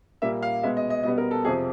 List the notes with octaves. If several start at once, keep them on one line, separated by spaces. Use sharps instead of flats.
A#2 G3 A#3 E5
F5
B2 G#3 B3 E5
D#5
D#5
B2 G3 B3 D#5
A#4
A4
F2 C3 F3 G#4